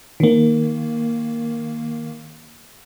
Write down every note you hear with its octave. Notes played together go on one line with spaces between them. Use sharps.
D#3 A#3